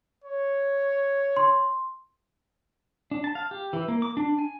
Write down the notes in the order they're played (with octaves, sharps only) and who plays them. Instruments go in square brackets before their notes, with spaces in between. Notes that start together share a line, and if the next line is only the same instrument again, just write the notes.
[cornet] C#5
[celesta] C6
[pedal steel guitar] D4
A5
F5
G4
E3
A#3
D6
D4
G#5